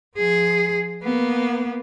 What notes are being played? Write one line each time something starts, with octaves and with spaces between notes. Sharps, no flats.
F3 G#4
A#3 B3